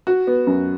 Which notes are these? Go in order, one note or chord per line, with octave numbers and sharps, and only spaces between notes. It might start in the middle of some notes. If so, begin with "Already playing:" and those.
F#4
B3
F#2